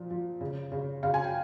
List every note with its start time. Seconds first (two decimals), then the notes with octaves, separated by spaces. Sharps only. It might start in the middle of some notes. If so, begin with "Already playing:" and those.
Already playing: A#2 F3
0.11 F3
0.41 C#3
0.72 C#3
1.03 C#3 F5
1.14 G#5
1.24 G5